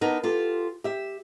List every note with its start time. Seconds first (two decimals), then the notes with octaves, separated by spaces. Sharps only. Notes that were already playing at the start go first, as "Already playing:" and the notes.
0.01 B3 D4 D#4 A#4
0.23 F4 G4 A4
0.84 G4 E5